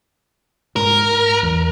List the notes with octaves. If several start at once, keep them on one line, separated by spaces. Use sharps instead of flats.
G#2 A#4
E2